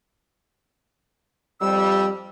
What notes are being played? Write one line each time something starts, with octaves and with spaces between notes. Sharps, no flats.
F2 G3 E6